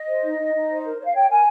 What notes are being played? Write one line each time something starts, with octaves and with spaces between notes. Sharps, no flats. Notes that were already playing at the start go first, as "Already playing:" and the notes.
Already playing: D#5
C5
D#4
D#4
D#4
C5
A#4
C#5
F5
C#5 G5
A#4 G#5